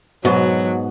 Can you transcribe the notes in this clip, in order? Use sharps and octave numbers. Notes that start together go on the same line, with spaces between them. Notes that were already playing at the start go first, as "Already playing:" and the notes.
G#2 B2 F#3